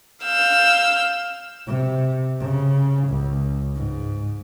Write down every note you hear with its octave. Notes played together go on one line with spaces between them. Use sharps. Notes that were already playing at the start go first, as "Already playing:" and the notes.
F5 E6 G6
C3
C#3
C#2
G#2